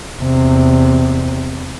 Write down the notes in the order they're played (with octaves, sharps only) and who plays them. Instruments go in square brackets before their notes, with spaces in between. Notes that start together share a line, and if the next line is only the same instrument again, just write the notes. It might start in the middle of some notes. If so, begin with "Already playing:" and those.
[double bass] E2 C3